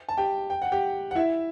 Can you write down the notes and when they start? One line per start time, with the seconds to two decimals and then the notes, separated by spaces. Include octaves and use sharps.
0.09 A5
0.17 G4 G5
0.50 G5
0.62 F#5
0.72 G4 G5
1.11 F#5
1.15 E4 E5